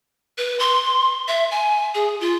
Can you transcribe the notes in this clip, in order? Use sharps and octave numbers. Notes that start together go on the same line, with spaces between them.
B4
C6
E5
G#5
G#4
F4